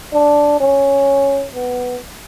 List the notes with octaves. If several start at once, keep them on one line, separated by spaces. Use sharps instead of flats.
D4
C#4
B3